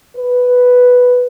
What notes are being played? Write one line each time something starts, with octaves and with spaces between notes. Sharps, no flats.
B4